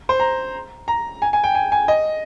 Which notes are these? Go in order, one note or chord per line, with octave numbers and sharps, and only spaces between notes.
C5
A#5
A#5
G#5
G#5
G5
G#5
G#5
D#5